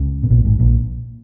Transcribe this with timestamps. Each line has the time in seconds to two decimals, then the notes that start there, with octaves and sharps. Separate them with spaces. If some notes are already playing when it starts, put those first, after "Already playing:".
Already playing: C#2 C#3
0.23 B2
0.30 A#1 A#2
0.45 G#1 G#2
0.59 A#1 A#2